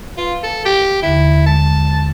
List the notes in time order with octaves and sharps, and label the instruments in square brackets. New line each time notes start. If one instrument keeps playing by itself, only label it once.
[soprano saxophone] F4 [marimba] B4 F5
[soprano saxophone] A4
G4
[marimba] D#2 D3 [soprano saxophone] E4
[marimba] G#3 [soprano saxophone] A5